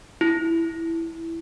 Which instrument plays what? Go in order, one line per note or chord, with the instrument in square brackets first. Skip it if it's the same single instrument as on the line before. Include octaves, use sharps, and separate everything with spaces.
[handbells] E4